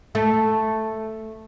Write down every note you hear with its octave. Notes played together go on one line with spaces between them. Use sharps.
A3